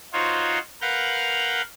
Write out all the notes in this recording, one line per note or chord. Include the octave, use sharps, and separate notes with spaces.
D#4 F4 F#4 C5 C#5
A#4 B4 F5 F#5 F6 G6